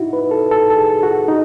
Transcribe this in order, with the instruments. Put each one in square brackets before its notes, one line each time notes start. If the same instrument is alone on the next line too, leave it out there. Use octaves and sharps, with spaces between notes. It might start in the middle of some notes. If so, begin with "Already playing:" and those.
Already playing: [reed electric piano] D#4 E4 F#4
B4
A4
A4
A4
G#4
F#4
D#4